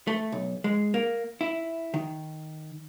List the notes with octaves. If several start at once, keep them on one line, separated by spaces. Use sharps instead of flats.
A3
B1
G#3
A#3
E4
D#3